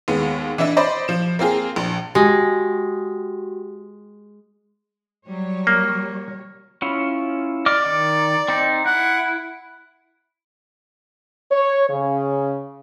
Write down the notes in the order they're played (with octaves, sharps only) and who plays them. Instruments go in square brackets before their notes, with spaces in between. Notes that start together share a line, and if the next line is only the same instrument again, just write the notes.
[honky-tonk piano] D#2 G#3 B3
E3 D4 E4 D#5 E5
C5 D5 D#5 B5
F3 E7
A#3 C4 F4 G#4
A#1
[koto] G#3 [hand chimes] F#4 G4
[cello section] F#3 G3 C#5
[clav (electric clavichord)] A#3
[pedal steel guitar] C#4 E4 F4
[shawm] D5 [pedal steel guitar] D#5 D6 F6
[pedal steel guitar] D#3
C4 D#4
[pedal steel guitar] E4 [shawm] F#5
[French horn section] C#5
C#3